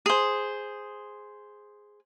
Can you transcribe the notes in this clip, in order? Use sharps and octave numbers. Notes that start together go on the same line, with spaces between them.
G#4 C5